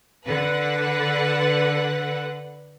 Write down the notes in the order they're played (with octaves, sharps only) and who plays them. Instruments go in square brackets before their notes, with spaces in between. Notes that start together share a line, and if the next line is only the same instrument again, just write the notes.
[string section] D3 B4 F#5